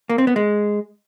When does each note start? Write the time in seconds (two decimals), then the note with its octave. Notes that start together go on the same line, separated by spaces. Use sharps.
0.09 A#3
0.18 C4
0.27 B3
0.36 G#3